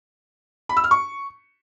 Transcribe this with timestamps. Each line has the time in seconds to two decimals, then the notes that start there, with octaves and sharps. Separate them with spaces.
0.69 B5
0.77 E6
0.84 F6
0.91 C#6